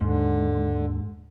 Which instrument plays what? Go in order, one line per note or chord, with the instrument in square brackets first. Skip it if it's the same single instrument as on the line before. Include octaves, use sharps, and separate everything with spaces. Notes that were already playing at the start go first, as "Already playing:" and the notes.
[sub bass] D#2 [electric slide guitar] G#2 [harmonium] D3